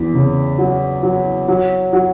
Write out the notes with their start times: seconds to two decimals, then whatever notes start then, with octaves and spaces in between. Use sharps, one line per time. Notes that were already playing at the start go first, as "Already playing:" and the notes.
Already playing: E2
0.14 C#3
0.58 F#3
1.03 F#3
1.48 F#3
1.93 F#3